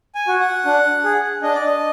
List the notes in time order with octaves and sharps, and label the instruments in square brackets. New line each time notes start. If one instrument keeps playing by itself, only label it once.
[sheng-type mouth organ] G#5
F#4
F#5
D4
G#4
D4 D#5
D5
D#5